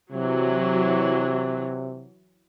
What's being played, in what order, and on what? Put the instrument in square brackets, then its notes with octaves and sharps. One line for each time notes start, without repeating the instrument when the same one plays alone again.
[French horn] C3 [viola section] E3 F#3